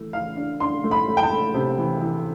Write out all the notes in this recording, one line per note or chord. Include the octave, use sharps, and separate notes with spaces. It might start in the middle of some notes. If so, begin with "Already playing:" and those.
Already playing: E3 A3
E3 F5
D4
D4 C6
A3
B5
A3
G5
A5
A3
C3
E3
E3